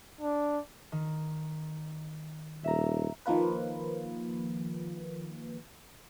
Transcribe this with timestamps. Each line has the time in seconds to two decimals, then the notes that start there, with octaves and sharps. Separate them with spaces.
0.21 D4
0.92 D#3
2.64 D#1 E5 A#5
3.26 D#3 F3 A#3 F4 B4